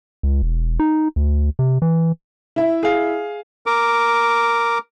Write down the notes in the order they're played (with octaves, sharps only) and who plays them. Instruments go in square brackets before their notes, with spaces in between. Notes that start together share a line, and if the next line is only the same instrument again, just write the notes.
[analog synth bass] C#2
E1
D#4
D2
C3
E3
[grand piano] E4 E5
[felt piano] G#4 F5
[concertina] A#4 D6